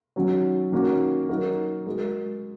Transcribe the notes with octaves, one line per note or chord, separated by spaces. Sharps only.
D#3 F#3 C#4
D#3 A#3 C#4 F#4
F#3 D#4 F#4 A#4
G#3 F#4 A#4